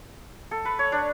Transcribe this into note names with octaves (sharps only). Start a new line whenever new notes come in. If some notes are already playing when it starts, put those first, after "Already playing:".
A4
B4
C#5
D4 D5